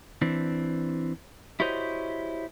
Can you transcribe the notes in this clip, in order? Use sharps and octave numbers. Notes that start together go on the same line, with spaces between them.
E3 C4 D4
E4 F#4 G4 C5 C#5 D#5